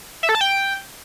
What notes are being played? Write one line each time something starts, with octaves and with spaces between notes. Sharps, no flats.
E5
A4
A5
G5